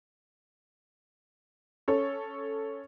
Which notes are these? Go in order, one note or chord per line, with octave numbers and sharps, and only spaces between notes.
C#4 A4 C#5